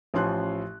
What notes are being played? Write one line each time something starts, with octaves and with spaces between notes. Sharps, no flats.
A1 F3 C#4 C6 F#6